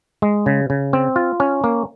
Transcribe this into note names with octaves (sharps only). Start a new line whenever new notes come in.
G#3
C#3
C#3
C4
F4
C#4
A#3